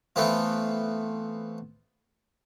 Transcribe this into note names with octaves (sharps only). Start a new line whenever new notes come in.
E3 A3 B3 C4 F4